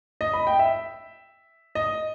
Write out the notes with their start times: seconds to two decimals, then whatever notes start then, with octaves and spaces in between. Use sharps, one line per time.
0.21 D#5
0.34 B5
0.47 G5
0.59 E5
1.75 D#5